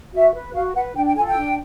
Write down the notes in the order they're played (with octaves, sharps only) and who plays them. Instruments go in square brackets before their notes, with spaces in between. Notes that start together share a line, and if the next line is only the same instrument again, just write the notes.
[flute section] F#4 E5
B4
F#4 F5
B4 F#5
D4 G5
G5
F4 A4 G#5
G5
D4